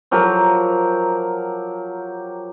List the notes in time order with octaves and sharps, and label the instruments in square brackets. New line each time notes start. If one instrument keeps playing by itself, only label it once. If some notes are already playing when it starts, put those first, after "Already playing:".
[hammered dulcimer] F3 F#3 G4 A#4